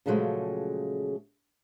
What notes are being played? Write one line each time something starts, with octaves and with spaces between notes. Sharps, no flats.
A#2 C#3 F3 F#3 G#3 A3